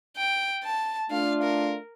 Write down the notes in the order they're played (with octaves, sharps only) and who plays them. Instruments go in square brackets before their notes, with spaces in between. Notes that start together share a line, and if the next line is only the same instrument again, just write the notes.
[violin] G5
A5
[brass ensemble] A3 D4 F4 [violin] F5
[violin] A#4